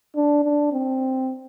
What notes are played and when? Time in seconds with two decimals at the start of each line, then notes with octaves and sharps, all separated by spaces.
0.16 D4
0.44 D4
0.73 C4